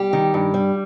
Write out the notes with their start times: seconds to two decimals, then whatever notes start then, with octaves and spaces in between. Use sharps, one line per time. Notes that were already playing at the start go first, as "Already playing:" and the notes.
Already playing: G3 G4
0.13 D#3
0.34 G2
0.54 G3